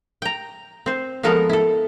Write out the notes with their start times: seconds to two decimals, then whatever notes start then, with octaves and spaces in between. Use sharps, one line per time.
0.22 G5 A#5
0.86 C4 C5
1.23 F3 G#3 B3 A4 A#4
1.49 E4 A4